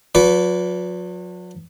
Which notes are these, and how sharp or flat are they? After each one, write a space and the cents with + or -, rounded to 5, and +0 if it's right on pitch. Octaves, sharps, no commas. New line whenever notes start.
F#3 -45 B4 +0 D5 -35